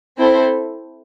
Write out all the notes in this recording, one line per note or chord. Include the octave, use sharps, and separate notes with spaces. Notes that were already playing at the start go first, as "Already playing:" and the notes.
C4 E4 A4 C5